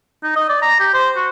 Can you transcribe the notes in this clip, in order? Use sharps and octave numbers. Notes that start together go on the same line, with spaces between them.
D#4
D#5
D5
A#5
G4
C5
F#4